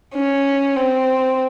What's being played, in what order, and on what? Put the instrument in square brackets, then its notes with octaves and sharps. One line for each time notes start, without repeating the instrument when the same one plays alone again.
[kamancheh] C#4
C4